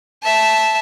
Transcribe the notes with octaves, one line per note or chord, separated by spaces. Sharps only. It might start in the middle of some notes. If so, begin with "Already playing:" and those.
E5 A5